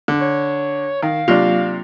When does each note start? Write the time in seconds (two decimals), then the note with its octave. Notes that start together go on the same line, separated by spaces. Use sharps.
0.08 D3
0.21 C#5
1.02 D#3 F5
1.28 C3 F#3 A#3 D4 F4